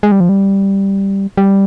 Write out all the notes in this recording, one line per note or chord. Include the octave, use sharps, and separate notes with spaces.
G#3
G3
F3
G3
G3